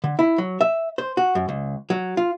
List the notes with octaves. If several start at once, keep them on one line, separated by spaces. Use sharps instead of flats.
D3
E4
F#3
E5
C5
F#4
F#2
C#2
F#3
F4